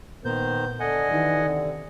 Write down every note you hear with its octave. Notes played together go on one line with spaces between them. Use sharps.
A#2 D#3 B3 A#4 C5 G6
D3 A4 D#5 F#5 G#5
D#3 E3 D#4 G4
C3